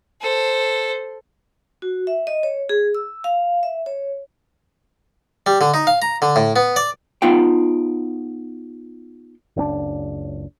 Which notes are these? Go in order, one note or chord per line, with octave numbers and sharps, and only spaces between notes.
A4 C5
F#4
E5
D#5
C#5
G#4
E6
F5
E5
C#5
G3
D3
D#4
F5
A#5
D3
A2
B3
D5
B3 D#4 F4 G5
F#1 C#2 C4 D4